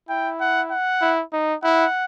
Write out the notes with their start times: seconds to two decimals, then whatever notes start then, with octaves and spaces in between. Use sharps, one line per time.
0.09 E4 G5
0.40 F#5
0.71 F#5
1.01 E4
1.33 D#4
1.64 E4 F#5